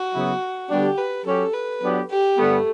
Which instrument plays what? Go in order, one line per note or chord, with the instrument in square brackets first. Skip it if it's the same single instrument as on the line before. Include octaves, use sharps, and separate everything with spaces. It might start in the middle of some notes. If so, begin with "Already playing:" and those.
Already playing: [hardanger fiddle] F#4
[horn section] C#3 F#3 B3 E4
[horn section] D3 G3 B3 D4 [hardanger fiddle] G4
[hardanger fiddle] B4
[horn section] F#3 C#4 G4 [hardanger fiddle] A4
[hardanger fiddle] B4
[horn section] F#3 B3 D4 G4
[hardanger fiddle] G4
[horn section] G2 D3 G3 B3 [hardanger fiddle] A3